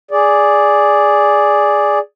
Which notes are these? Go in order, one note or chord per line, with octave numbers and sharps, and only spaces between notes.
G#4 D5